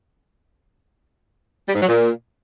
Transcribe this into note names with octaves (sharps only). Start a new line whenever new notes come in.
G3
G#2
F#3
A#2